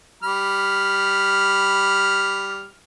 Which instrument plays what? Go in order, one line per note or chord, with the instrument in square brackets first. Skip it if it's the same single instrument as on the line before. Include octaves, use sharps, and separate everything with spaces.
[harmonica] G3 B5 F6